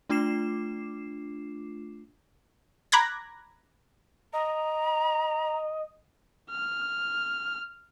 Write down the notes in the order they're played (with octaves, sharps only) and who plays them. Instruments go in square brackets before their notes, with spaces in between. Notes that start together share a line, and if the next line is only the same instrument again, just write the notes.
[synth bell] A3 D4 F4 D6 C7 E7
[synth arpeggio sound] A#5 B5 D6 F#6 G#6 A#6
[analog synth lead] D#5 [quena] A#5
[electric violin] F6